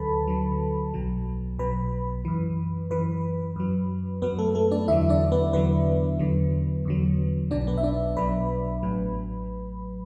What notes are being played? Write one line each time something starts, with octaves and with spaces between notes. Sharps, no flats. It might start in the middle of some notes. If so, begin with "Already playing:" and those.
Already playing: D2 D3 F#3 A4 B4 A5 B5
D2 D3 F#3
B1 B2 F#3
B1 B2 F#3 B4 B5
F#2 E3
F#2 E3 B4 B5
F#2 F#3
F#2 F#3 B3 B4
A3 A4
A3 A4
D4 D5
E2 D3 F#3 E4 E5
D4 D5
B3 B4
E2 D3 F#3 B3 B4
E2 D3 F#3
E2 D3 F#3
B1 B2 F#3 D4 D5
B3 B4
E5
D4 D5
B1 B2 F#3 B4 B5
A1 A2 F#3